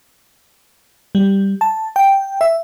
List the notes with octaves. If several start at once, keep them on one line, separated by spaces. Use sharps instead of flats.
G3
A5
G5
E5